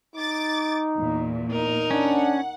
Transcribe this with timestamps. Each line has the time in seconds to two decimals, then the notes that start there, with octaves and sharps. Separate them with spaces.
0.16 D#4 D6 A6
0.96 E2 A#2
1.51 D#4 A#4
1.91 C#4 D4 F#5